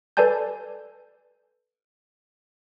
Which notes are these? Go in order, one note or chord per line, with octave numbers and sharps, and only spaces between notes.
A4 B4 D5 G#5 A5 G6